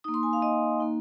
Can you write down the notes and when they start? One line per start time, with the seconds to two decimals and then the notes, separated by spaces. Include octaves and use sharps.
0.04 A#3 D#4 D#6
0.14 C6
0.23 G#5
0.33 F5
0.42 D#5
0.80 A#3 D#4